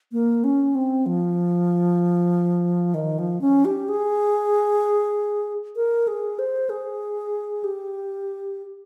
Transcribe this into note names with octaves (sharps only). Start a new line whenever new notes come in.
A#3
C#4
C4
F3
D#3
F3
C#4
G4
G#4
A#4
G#4
C5
G#4
G4